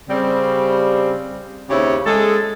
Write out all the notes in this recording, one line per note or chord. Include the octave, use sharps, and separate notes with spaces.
C#3 G3 C4
D#2 C#3 C4 E4 G4 C#5
G#3 A4